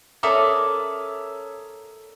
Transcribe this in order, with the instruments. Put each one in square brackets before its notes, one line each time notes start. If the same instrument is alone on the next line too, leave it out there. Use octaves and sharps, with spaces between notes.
[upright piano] C#4 E5 D#6 [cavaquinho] A4 A#4 D5